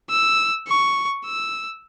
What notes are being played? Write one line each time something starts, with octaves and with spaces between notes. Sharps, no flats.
E6
C#6
E6